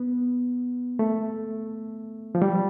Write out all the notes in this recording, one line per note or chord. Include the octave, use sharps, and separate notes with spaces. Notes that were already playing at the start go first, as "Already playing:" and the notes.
Already playing: B3
A3
F3
G3